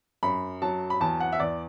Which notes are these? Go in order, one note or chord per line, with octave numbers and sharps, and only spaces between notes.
F#2 B5
F#3 A5
B5
E2 A5
F#5
E5
E2 D5